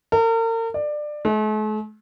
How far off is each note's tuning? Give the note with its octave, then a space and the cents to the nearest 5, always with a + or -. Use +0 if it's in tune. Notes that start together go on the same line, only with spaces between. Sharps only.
A#4 -40
D5 +20
A3 -45